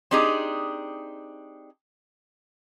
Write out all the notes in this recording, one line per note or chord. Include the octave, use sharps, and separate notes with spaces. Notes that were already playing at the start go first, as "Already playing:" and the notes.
C4 D4 D#4 G4 G#4